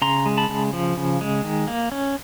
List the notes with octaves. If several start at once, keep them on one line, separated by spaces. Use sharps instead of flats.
C#3 A#5 C6
G#3
A5 B5
C#3
F3
C#3
G#3
D#3
A#3
C#4